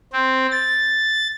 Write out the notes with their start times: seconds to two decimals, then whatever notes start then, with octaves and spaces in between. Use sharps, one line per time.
0.13 C4
0.52 A6